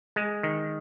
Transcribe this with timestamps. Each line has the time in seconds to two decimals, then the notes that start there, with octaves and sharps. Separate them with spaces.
0.16 G#3
0.43 D#3